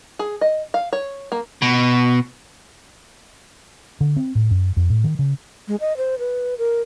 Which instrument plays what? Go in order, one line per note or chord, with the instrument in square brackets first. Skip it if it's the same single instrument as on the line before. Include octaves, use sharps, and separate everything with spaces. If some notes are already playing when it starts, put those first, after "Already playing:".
[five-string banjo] G#4
D#5
F5
C#5
A#3
[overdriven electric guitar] B2
[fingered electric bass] D3
C4
A2
F#2
F2
A2
D#3
C#3
[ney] G#3
D#5
C5
B4
A#4